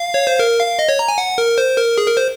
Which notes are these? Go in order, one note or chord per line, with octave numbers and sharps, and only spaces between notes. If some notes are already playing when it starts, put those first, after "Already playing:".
Already playing: F5
C#5
C5
A#4
F5
D#5
C#5
A#5
G#5
F#5
A#4
C5
A#4
G#4
A#4
C5